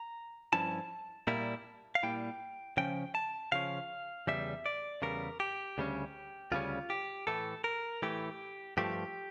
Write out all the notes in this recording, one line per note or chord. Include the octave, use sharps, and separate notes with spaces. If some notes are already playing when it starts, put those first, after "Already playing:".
Already playing: A#5
G2 F3 C#4 E4 A5
A#2 G3 A#3 E4
F5
A#2 G3 A#3 E4 G5
C#3 F3 C#4 G5
A5
C#3 F3 C#4 F5
E2 C#3 G3 E5
D5
E2 C#3 G3 A#4
G4
D2 C#3 G3 C#4
D2 C#3 G3 C#4 F4
G4
A2 E3 A3 A4
A#4
A2 E3 A3 G4
G2 F3 A3 G4